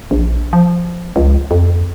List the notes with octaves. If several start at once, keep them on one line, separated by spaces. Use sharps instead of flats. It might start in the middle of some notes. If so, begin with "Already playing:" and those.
A#1
F3
C#2
F2